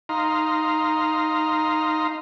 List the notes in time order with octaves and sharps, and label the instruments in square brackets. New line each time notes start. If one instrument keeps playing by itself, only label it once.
[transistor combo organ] D#4 F5 A#5 C6